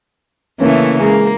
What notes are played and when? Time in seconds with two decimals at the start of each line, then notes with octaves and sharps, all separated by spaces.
0.60 C#3 E3 A3 A#3 C#4
1.00 G#3 A#3